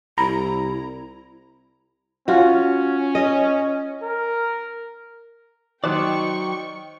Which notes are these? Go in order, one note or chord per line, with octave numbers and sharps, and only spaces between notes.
C2 E4 A#5 B5
C#4 F4 F#4
D#5
A#4
D#3 F#3 C5 D5 D#5 G5 C#6 F#6